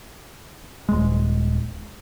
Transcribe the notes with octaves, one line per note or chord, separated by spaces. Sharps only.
D#1 G#3